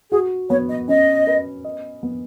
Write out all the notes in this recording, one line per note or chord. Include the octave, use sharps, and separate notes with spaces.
F#4 G#4
B3 C#5
D#5
C#4 D#5
B4
D#5
B3